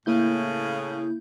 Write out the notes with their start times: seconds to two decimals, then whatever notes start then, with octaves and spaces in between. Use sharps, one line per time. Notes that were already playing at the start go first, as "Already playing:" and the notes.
0.06 A2 C#3 A#3 E4 G6